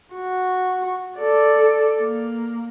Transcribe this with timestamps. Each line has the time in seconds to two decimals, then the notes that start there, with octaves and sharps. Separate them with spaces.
0.14 F#4
1.19 A4 D5
2.00 A#3